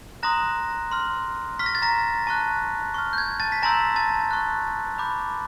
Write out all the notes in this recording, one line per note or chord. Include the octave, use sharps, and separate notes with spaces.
A#5 C6 D#6 F#6 A#6
C6 F6
C#6 F6 B6
A#6
A6
A#5 A#6
A5 C#6 F#6
C#6 F6
G6
G#6
A5 A6
B6
G#5 A#5 C6 E6 G6 A#6
A5 A6
C#6 F#6
B5 D6 G6